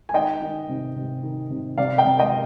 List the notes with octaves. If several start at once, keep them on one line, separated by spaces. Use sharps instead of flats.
G#5
D#3 D#5 G5
D#3
C3
C3
D#3
C3
C3 D5 F5
D#5 G5
C3
D#5 G5